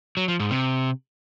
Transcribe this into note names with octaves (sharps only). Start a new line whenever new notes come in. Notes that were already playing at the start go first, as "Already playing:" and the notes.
F#3
F3
G#2
C3